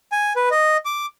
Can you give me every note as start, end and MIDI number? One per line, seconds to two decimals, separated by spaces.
0.12 0.33 80
0.36 0.49 71
0.51 0.77 75
0.85 1.06 86